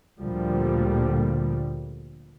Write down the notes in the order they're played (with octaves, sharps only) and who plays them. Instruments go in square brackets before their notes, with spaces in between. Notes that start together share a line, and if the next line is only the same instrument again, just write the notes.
[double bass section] D2 A#2 D3 F3 G3